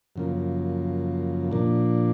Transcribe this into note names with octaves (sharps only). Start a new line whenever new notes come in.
F#2 C#3 F3 A#3
A#2 F3 A#3 D4